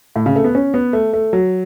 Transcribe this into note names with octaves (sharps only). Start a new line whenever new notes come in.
A2
C#3
A3
B3
C#4
B3
A3
A3
F#3